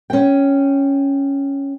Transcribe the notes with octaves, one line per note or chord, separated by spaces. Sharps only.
C#4 G5